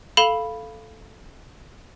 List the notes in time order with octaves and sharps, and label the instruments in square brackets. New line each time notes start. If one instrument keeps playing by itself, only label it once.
[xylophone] A4 F5 B5 E7 F7 G7